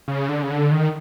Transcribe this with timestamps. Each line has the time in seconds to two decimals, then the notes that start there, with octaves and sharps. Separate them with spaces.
0.08 C#3
0.29 D3
0.42 C#3
0.50 D3
0.72 D#3